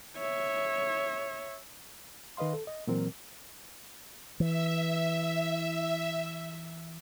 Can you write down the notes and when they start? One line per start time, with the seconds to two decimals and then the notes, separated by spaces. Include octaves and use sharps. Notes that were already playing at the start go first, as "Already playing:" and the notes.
0.17 C#5 E5
2.37 D#3 B4 D#5 F5 C6
2.53 A4
2.67 D#5
2.87 A#2 E3 F#3 C4 A#4
4.40 E3 E5